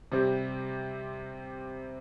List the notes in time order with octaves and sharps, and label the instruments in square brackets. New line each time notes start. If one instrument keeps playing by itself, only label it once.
[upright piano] C3 G3 C4 G4